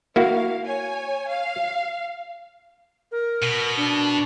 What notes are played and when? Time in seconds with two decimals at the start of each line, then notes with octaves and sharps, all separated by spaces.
0.16 A#3 E4 F#4 F5
0.64 C#5 G#5
1.30 F5
3.12 A#4
3.43 B2
3.77 D4